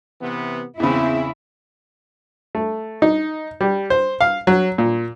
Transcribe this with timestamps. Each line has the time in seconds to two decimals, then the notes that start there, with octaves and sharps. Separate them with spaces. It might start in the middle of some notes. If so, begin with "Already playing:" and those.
0.20 C3 E3 B3
0.80 E2 C#3 C4 E4
2.55 A3
3.02 D#4
3.61 G3
3.90 C5
4.21 F5
4.47 F#3
4.78 A#2